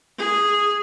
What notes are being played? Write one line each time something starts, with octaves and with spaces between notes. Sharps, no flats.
G#4